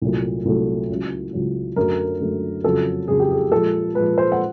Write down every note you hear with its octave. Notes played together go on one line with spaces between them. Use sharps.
C2 A#2 F#3 A3
C2 A#2 F#3 A3
C#2 C#3 F#3
C#2 C#3 F#3
F#2 D3 F#3 A3 A#4
F#2 D3 F#3 A3
F2 C#3 F#3 A4
F2 C#3 F#3 G#4
G4
G#4
A#2 F3 G#3 A4
A#2 F3 G#3 B4
C5
F#5